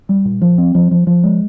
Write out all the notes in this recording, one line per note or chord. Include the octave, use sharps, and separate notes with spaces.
G3
A#2
F3
C4
F3
F3
F3
G#3